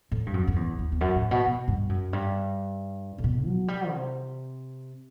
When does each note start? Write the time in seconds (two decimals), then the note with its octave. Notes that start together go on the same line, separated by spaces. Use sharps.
0.11 A2
0.26 G2
0.34 F#2
0.47 F#2
0.56 E2
0.79 E2
0.92 E2
1.01 F#2
1.16 A2
1.31 B2
1.46 B2
1.68 G2
1.89 F#2
2.13 G2
3.18 A2
3.24 B2
3.46 F#3
3.68 G3
3.91 C3